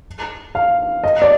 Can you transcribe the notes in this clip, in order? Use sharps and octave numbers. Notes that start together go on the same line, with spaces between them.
F5
D#5
D5